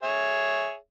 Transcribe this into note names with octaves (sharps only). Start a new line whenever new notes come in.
G#4 C#5 E5